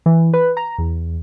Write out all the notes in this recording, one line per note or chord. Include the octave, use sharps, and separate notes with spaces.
E3
B4
A#5
E2